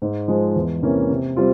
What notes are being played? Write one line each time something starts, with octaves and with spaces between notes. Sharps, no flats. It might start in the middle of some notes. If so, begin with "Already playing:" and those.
G#2
F3 G#3
E2
C3 E3 A#3 C#4
C3
G3 C4 F4